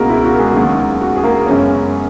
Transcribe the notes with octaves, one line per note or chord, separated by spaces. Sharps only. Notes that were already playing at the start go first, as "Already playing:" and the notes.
Already playing: C#2 B2 G#3 A#3 B3 F#4 G#4 A#4
E4
F#4
A#4
G#3 G#4
D#2 C#3 F#3
F#4
G#4
A#3 A#4
F#2 C#3 G#3 B3 C#4 C#5